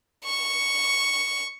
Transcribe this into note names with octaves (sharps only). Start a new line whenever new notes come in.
C#6